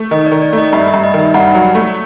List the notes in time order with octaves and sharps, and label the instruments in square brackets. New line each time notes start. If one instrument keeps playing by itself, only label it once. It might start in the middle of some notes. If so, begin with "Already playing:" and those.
Already playing: [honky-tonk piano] A3
[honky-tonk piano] D#3 [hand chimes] D#5
[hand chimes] D5
[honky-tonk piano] D#3
[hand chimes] D5
[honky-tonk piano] A3 [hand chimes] D#5
[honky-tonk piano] G2 [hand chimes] E5
[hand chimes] E5
[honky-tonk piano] G2
[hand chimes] D#5
[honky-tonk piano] D#3
[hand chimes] E5
[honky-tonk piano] G2 [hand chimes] F#5
[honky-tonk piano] F#3
A3